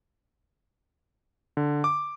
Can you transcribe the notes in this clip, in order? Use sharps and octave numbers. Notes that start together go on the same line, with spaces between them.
D3
D6